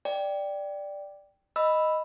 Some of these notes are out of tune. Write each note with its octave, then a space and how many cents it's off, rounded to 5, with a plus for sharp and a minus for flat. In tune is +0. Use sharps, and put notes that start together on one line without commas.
D5 +0 G5 +0
D#5 +0 B5 +0 E6 +0